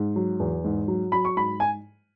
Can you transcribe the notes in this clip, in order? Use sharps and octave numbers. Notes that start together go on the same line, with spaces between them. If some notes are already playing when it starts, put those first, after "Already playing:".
Already playing: G#2
F#3
E2
G#2
F#3
F#3 B5
C#6
G#2 B5
G#5